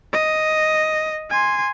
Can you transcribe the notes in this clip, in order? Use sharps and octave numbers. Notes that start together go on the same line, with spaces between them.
D#5
G#5 C6